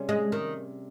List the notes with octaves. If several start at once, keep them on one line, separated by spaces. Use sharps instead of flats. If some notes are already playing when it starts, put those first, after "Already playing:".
Already playing: C3 G3 C#4 G#4
G#3
D#3